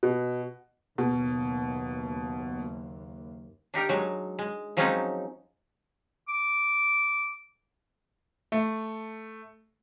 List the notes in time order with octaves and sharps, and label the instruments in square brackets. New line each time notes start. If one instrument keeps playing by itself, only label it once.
[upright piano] B2
[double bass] F#1 D#2 [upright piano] B2
[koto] D4 D#4 G4 A#4
F#3 G#3
G#3
F3 F#3 G#3 C4 C#4 D#4
[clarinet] D6
[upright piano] A3